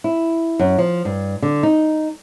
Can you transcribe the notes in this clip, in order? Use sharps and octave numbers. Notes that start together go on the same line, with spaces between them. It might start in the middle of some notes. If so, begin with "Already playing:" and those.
E4
F#2
F3
G2
D3
D#4